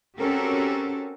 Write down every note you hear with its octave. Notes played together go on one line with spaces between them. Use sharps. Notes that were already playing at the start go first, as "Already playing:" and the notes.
C4 C#4 F#4 G4 A4 A#4